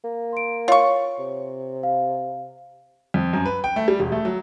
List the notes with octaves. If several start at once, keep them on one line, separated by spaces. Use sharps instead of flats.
A#3
C6 D7
F4 C#5 C#6
C3
F5
F2
F#2
B4
G5
A3
G3
E1
A3
F#3